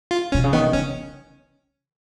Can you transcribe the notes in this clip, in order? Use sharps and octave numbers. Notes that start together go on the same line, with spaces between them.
F4
B2 C#4
C#3
D#3 B3
C#3 C#4